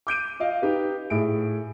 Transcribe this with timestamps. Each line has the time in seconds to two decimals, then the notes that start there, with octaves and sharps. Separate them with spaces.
0.07 D6 G6 D7 D#7
0.40 F4 D#5 F5
0.62 D#4 G4 B4
1.10 A2 G#4 D7